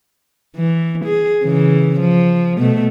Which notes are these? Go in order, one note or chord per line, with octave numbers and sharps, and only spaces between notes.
E3
G#4
C#3 E3
F3
B2 A3